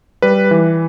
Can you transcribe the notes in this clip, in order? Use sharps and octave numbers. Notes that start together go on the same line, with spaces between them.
G3 B4
E3